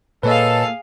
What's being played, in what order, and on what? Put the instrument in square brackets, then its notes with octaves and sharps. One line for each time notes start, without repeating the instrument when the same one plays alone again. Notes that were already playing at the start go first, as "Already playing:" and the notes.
[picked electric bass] A#2 A#3 [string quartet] G#4 F5 [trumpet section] A4 [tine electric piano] B4 C#5 D#5